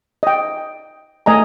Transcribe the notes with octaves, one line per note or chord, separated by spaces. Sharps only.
D#5 G5
A3 D#5 G#5 A#5